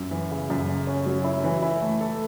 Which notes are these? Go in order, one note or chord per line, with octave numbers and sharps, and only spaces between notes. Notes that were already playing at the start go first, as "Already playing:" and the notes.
Already playing: F#2
E3
C#3
F#2
C#3
C#4
F#3
E4
E3
E4
A3
A4